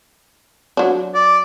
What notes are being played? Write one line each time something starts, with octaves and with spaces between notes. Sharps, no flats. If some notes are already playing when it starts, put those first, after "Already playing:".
F#3 D4
D5